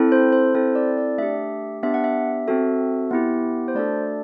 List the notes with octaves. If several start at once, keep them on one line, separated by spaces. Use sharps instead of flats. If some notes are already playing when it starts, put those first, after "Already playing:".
Already playing: C4 E4 A4
C5
C5
C4 E4 A4 C5
D5
D5
A3 D4 G4 E5
B3 D4 G4 E5
F#5
E5
C4 F#4 A4
B3 E4 G4
C5
A3 D4 F#4 A4 D5